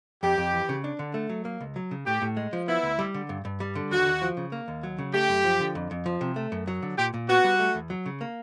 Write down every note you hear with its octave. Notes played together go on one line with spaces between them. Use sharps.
F2 G4
F2
E3
C#3
D4
D3
A3
F#3
A#3
C#2
F#3
C#3
A2 G4
A2
G#3
F3
B3 E4
D2
G3
D3
G2
G2
G3
D3
D#2 F#4
D#2
F3
C#3
A#3
D#2
F#3
C#3
A3 G4
F#2
F3
D3
F2
F2
F3
C3
A3
F#2
F#3
D3
A#2 G4
A#2
B3 F#4
G3
A3
E2
F#3
C#3
A#3